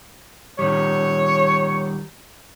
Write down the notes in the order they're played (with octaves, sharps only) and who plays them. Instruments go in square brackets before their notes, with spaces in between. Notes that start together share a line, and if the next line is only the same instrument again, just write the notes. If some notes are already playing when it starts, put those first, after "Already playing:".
[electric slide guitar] D#3 G3 [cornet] C#5